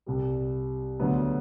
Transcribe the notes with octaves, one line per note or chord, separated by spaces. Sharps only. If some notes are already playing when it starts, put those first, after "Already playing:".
C2 C3 G3
D2 D3 F#3 B3 B4